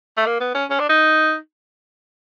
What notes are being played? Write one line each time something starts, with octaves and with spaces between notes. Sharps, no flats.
A3
A#3
B3
C#4
C#4
D4
D#4